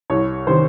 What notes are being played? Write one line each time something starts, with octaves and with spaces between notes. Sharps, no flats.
C2 C#5
C3 D#3 C5